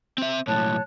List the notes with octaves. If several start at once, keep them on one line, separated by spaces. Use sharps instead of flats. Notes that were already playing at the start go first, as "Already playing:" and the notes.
C4 E5
B1 A2 C#5 A5 F#6